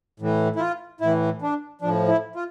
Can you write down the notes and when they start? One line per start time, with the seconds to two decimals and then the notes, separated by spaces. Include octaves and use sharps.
0.20 A2 E3
0.56 E4
0.60 F4
1.01 A2 E3 E4
1.42 D4
1.81 A2 F3 D4
2.08 E4
2.36 F4